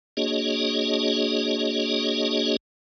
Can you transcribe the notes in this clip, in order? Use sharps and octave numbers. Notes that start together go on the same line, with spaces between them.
A#3 D4 F#4 G#4 C#5 D#5